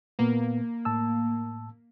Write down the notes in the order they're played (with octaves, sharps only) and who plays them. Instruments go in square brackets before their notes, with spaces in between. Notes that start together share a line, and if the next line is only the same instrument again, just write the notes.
[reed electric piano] A#2 B3 [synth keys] A#3
[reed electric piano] A2 A5 E6